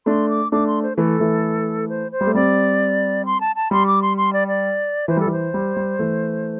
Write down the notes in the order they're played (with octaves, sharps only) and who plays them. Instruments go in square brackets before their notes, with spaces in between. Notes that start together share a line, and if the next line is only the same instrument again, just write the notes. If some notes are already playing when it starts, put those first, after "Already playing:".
[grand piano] A3 D4 [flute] C6
[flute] D6
[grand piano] A3 D4 [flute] D6
[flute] C6
C5
[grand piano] E3 A3 [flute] A4
[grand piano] E3 A3
[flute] C5
C5
[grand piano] G3
A3
[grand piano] G3 C4 [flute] D5
[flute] C6
A5
A5
[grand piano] G3 [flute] C6
[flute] D6
C6
C6
D5
D5
[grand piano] E3 [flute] C5
[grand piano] G3 [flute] A4
[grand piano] E3
[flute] C5
[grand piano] G3
G3
E3 A3